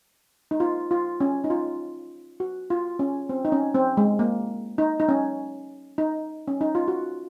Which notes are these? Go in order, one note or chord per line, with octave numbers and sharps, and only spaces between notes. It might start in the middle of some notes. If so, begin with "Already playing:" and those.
D#4
F4
F4
C#4
D#4
F4
F#4
F4
C#4
C4
D#4
C#4
C4
G#3
A#3
D#4
D#4
C#4
D#4
C#4
D#4
F4
F#4